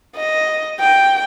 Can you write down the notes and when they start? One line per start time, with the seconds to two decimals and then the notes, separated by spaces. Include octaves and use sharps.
0.16 D#5
0.80 G5